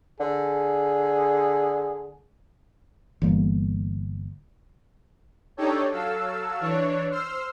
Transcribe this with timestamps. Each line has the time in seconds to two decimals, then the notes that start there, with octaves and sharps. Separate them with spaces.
0.20 D3 G#4
3.22 G1 E3 G3 A#3
5.57 D4 D#4 G4 A4 C#5
5.91 F#3 A4 F5 E6
6.61 E3 D4 C#5
7.11 C5 E6 F6 C7